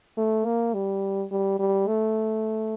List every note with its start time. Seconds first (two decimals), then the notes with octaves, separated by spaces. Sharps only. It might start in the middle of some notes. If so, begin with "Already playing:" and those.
0.17 A3
0.45 A#3
0.74 G3
1.31 G3
1.59 G3
1.87 A3